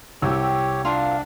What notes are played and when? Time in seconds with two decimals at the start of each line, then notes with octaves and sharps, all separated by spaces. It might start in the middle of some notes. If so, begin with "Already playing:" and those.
0.22 C2 G4 C#5 G5 C#6 E6
0.85 D4 F4 A#4 F5